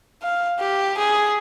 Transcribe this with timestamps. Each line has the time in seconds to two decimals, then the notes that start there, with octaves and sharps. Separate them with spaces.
0.23 F5
0.60 G4
0.97 G#4